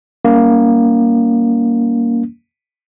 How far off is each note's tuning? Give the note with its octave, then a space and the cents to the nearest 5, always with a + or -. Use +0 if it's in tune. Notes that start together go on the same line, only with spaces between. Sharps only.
G3 +0 A#3 +0 C#4 +35